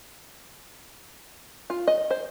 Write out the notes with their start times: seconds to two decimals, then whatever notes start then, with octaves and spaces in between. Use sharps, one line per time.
1.70 F4
1.87 D#5
2.11 C5